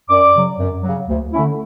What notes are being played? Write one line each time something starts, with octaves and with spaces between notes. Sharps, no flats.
F#2 D5 D6
C#3 F#3
F#2
C#3 F#3
D2
D3 A3 C#4 E4